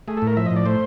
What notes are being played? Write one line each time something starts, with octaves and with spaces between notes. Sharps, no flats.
A3 G#4
A2 A4
A#4
F3 E5
A2 D#5
D5
A3 C5